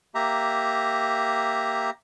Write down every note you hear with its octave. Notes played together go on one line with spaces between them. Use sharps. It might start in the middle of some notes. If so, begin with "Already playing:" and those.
A#3 G4 E5 A#5